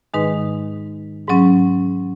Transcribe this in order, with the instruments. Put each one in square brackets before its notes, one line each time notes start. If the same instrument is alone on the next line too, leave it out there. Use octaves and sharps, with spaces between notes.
[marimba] G#2 D#3 G#3 D#4 B4
G#2 F#3 C#4